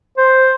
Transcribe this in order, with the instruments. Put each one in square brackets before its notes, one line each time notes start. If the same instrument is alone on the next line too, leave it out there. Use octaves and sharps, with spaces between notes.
[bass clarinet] C5